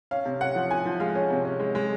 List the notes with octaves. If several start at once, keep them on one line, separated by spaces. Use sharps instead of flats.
C#4 F5
C3
C#4 F#5
F3
F3 G#5
F3
G#3 F5
C#4
C3
C#4
G#3
G#3